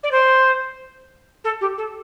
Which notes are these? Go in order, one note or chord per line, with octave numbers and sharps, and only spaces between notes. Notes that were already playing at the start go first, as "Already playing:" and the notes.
D5
C5
A4
G4
A4